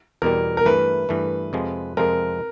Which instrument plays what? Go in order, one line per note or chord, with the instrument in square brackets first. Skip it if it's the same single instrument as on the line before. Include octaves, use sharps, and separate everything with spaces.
[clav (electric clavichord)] E2 B2 G3 [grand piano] A#4
[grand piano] A#4
[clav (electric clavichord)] G2 E3 A3 [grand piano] B4
[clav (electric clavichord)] G2 E3 A3
F2 C3 F3 G#3
[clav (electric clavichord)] F2 C3 F3 G#3 [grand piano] A#4